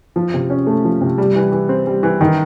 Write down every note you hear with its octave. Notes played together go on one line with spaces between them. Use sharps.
F3
C3
C#4
A3
F3
C3
G3
E3
E3
C4
G3
E3
D#3